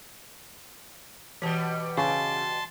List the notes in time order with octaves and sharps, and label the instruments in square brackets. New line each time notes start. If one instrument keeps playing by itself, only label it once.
[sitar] B2 G3 [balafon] E3 A5
[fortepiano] C#3 [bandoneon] A5 C6 [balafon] C#6